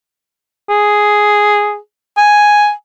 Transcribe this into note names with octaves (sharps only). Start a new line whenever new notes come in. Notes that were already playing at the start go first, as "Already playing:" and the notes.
G#4
G#5